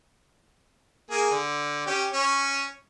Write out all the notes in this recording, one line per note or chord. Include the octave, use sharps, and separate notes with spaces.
A#3 G#4
D3
C#4 G4
C#4 C#6